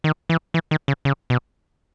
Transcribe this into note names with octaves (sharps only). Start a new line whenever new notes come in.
D#3
E3
E3
D#3
C#3
C#3
B2